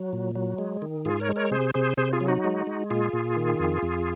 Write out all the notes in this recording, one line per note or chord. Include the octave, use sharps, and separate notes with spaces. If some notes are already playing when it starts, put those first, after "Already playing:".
Already playing: F#3
A#2
F#3
G#3
D#3
G#2 F4 G#4
A#4 C#5
G#3
A#4 C#5
C3 G#4 C5
C3 G#4 C5
C3 G#4 C5
F4 G#4
F#3
D#4 F#4
G#3
G#3
A#2 F4 G#4
A#2
D#3
F2
F2